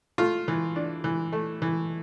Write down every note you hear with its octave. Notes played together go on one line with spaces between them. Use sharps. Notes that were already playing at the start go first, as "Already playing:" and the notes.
A3 F4
E3
D4
E3
A3
E3